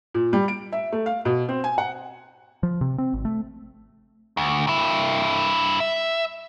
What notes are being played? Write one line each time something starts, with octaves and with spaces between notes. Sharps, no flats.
A#2
G3
D7
E5
A3
F5
B2
C4
G#5
F#5
F3
C3
C4
G#1
A3
D2
G2 E4
E5